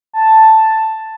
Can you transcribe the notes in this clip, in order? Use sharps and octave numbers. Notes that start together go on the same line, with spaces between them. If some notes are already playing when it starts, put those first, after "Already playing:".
A5